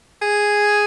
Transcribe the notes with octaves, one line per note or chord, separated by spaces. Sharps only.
G#4